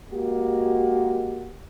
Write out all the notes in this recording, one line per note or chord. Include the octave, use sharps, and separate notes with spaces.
G#3 A#3 F#4 G4